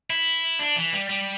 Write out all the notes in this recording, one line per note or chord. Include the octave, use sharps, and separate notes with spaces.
E4
D4
E3
G3
G3